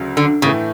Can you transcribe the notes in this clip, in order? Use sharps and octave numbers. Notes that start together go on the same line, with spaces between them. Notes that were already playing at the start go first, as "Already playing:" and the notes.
Already playing: D2 C#3 F#3
D3
A2 C#3 E3 A3